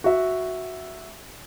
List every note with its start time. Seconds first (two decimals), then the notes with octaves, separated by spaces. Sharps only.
0.04 F#4 E5